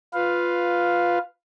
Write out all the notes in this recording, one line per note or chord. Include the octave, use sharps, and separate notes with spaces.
F4 B4 F5